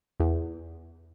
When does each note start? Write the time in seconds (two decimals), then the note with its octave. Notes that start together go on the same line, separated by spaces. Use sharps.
0.20 E2